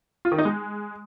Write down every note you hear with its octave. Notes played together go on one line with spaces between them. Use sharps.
F4
D#3
D#4
G#3